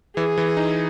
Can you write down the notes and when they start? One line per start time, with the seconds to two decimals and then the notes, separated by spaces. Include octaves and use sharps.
0.17 E3 G#4
0.38 E3
0.57 D#4